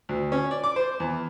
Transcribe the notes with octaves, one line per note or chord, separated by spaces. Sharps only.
D2
C#4
D5
D6
C5
E2